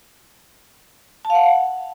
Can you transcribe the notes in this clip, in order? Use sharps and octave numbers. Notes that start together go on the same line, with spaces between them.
A5
F5
F#5